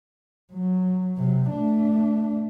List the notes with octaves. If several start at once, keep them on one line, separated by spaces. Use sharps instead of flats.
F#3
C3 F#3
A3 D4